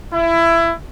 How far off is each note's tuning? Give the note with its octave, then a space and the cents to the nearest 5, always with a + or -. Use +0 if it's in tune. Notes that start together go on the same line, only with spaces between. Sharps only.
E4 +20